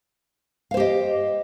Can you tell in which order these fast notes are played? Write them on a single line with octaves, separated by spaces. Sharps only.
F5 C5 G4 D#5